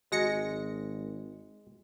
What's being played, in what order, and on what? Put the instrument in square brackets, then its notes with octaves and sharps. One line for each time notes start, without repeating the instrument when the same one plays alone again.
[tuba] G#1 [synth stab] F#3 A#6 C#7 [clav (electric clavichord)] G#3